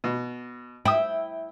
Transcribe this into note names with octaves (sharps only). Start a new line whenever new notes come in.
B2
E4 G5 D#6